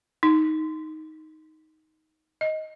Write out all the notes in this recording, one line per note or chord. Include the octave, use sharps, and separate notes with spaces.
D#4
D#5